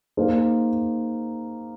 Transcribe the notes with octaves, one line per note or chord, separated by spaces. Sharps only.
A#3 D#4 G#4 C5